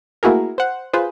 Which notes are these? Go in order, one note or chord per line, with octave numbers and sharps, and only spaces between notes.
A3 A#3 E4 F#4 G#4 A#4
C5 F#5
F4 G#4 B4 C5